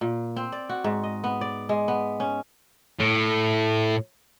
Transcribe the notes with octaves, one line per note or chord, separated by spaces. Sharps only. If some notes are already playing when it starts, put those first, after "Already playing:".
A#2
C4
D5
F#4
G#2
D#5
B3
D5
G#3
B3
C#4
A2